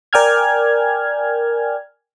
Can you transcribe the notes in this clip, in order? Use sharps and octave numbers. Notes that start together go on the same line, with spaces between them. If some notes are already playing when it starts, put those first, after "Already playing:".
A#4 D5 G5 G#5 F6 G#6